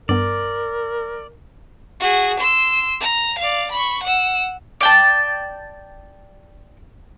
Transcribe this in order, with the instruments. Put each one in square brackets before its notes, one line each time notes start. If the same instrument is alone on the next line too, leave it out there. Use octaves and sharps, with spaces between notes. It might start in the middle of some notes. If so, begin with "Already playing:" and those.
[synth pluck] G2 B3 [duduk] A#4 [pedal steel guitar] D5
[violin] F#4 G#4
C6 E6
A#5
D5 F5
B5 C#6
F#5 E6
[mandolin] D5 G5 A5